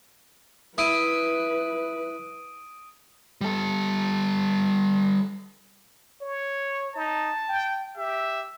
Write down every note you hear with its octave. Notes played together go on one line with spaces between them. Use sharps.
E4 B4 D#6 D7 D#7
G3 A4
C#5
D#4 A5
G5
G4 E5